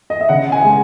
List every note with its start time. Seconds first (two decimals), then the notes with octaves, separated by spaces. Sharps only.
0.10 D#5
0.21 E5
0.29 C#3 F#5
0.52 G#5
0.64 G#3